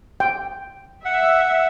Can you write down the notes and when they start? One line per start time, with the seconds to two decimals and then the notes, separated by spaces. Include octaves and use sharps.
0.20 G5
1.05 E5 F#5